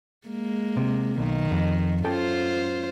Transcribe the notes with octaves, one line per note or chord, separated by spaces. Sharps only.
G#3 A#3
C3
B1 D#3
F2
F#2 F4 A4 C5 G5